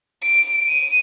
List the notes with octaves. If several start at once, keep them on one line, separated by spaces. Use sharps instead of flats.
D7
D#7